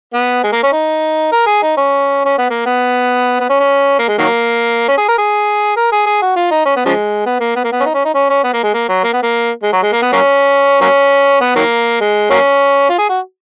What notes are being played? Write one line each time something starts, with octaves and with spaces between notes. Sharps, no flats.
B3
G#3
A#3
C#4
D#4
A#4
G#4
D#4
C#4
C#4
B3
A#3
B3
B3
C#4
C#4
A#3
G#3
D#3 F#3 A#3
C#4
G#4
A#4
G#4
A#4
G#4
G#4
F#4
F4
D#4
C#4
B3
C#3 F3 G#3
B3
A#3
B3
A#3
B3
C#4
D#4
C#4
D#4
C#4
C#4
B3
A#3
G#3
A#3
F#3
A#3
B3
A#3
G#3
F#3
G#3
A#3
B3
F#3 A#3 C#4
F#3 A#3 C#4
B3
D#3 F#3 A#3
G#3
F#3 A#3 C#4
F4
G#4
F#4